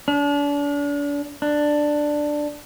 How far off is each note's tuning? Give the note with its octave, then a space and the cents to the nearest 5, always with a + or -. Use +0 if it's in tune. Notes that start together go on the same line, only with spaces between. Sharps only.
D4 -35
D4 +10